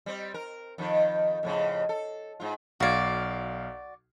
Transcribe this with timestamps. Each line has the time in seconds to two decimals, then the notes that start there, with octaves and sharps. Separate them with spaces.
0.06 G3 C4
0.34 A#4
0.78 F2 D#3
1.43 F2 A2 C#3
1.89 A4
2.40 G#2 F4
2.80 B1 F#4 D5 F5 G#6